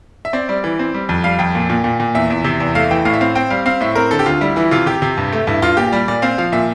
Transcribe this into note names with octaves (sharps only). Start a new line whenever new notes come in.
E5
C4 D5
G3 D5
E3
C4
G3
F2
G3 F5
F2 G5
A#2
A#2
A#2
A#2
E2 E5
E2
C3
E2
A3 F5
E3 G5
A2 F5
E5
C4 F5
C4 G5
G3 F5
C4 F5
A2 E5
C4 A#4
D3 A4
G4
D2 F4
G3 E4
E3 E4
C3 F4
C3 G4
C3
G2
A3
G2 E4
G2 F4
A#2 G4
G3 D5
A#2 D5
C4 F5
F3 F5
A#2 E5